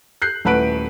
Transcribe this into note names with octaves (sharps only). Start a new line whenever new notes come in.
F#6 G6 C7
D#1 A3 E4 B4 F#5 D7